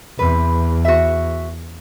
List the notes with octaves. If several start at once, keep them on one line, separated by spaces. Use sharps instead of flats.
E2 C3 B4
F#4 E5